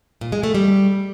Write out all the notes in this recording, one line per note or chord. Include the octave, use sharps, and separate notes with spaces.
A#2
G#3
A3
G3